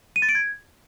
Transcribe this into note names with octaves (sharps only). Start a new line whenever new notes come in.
D#7
A6
D7
G#6